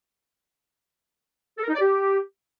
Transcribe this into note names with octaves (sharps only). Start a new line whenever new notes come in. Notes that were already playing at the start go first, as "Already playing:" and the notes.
A4
A#4
D#4
D5
G4